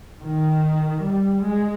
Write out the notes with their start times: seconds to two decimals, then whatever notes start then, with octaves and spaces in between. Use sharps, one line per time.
0.21 D#3
1.05 G3
1.45 G#3